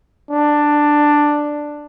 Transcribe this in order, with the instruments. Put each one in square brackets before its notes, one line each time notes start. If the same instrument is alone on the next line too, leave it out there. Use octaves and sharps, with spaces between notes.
[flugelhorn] D4